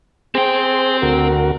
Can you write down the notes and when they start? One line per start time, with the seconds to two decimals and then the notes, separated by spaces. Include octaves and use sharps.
0.35 C4 G#4 C5 G5
1.02 D2 F#4 A#4